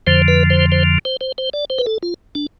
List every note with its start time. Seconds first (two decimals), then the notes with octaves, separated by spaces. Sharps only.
0.07 F2 D3 F3 C5
0.28 B4
0.50 C5
0.72 C5
1.05 C5
1.21 C5
1.38 C5
1.53 D5
1.70 C5
1.78 B4
1.87 A4
2.03 F4
2.35 D4